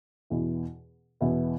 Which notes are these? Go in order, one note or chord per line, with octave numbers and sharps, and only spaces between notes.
E2 B2 B3 E4
E2 B2 B3 E4